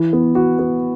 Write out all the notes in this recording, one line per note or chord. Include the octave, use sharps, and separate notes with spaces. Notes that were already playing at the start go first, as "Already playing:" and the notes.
Already playing: E3
B3
F#4
B3